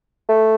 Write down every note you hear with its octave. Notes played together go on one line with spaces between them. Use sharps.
A3